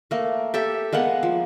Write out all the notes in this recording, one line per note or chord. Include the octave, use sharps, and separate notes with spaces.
A3 A#3
G4 A4 E5
G#3 A#3 B3 F#5
F3